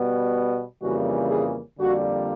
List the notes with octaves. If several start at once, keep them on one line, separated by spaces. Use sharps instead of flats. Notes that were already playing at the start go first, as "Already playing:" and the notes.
Already playing: B2 G3 B3
F2 C#3 E3 G3 A#3 F#4
G#4
F2 D3 G3 A#3 F#4